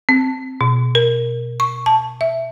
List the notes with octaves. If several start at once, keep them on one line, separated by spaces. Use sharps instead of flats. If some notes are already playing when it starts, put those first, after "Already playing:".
C4
B2
A#4
C#6
A5
E5